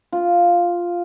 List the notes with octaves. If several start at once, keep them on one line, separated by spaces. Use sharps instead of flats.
F4